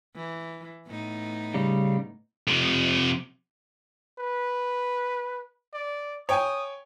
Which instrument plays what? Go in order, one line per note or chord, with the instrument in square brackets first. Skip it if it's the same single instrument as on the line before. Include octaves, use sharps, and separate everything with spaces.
[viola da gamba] E3
A2 B3 D#4
[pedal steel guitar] C#3 G3
[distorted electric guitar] F2 C3
[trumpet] B4
D5
[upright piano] C#5 G5 G#5 [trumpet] D#6